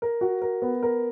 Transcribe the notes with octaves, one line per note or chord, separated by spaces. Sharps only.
A#4
F#4
A#4
B3
A#4